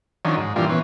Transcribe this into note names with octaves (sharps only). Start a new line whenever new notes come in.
D#3 F3 F#3 C#4 D4
G#2
A#2 E3 F3 G3 D4 F4
E3 B3 C#4